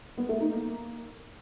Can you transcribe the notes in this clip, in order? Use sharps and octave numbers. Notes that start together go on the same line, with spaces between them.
B3
A3
D#4
A#3